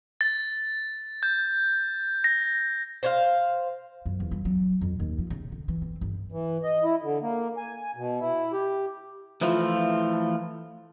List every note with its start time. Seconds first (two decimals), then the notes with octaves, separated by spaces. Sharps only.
0.21 A6
1.23 G6
2.24 A#6
3.03 C5 C#5 F5
4.06 F#2
4.20 E2
4.31 G3
4.45 F#3
4.81 F2
5.00 D#2
5.19 F3
5.30 C#3
5.52 D3
5.68 E3
5.82 C4
6.01 G1
6.32 E3
6.63 D#5
6.84 E4
7.03 D3
7.22 A#3
7.57 G#5
7.96 B2
8.20 E4
8.53 G4
9.41 E3 F3 A3 E4 F4